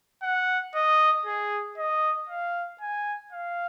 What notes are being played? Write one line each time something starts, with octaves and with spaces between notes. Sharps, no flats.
F#5
D#5
G#4
D#5
F5
G#5
F5